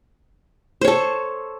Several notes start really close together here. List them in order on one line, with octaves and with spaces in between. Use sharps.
C5 C#5 A4